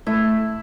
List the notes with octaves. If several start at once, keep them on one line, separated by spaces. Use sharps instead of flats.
A3 E4